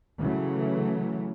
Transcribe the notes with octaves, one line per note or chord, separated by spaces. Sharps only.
C#3 E3 F#3 A3